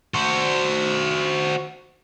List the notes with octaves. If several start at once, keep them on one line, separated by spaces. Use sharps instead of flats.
F#4 C5